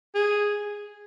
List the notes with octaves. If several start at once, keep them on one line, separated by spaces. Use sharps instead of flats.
G#4